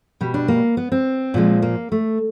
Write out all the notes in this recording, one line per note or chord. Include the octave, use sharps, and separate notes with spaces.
B2 G3
D4
A#3
B3
C4
A#2 F3 G#3
A#3
A3